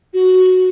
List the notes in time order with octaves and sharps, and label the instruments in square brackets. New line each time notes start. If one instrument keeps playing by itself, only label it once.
[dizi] F#4